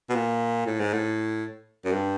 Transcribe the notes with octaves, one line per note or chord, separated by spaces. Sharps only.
B2
A#2
A2
G#2
A2
F#2
G2